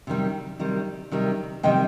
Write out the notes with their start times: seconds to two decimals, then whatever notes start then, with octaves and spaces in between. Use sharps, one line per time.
0.07 C3 D#3 G3
0.59 C3 D#3 G3
1.12 C3 D#3 G3
1.63 C3 D#3 G3 D#5 G5